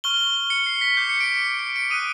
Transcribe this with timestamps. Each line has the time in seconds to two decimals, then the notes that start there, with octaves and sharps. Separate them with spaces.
0.04 C#6 F6 G7
0.50 C#7
0.66 C7
0.81 B6
0.97 D6 G6 C7
1.09 C#7
1.20 D7
1.32 C#7
1.45 C#7
1.59 D7
1.76 D7
1.90 D#6 F#6 D#7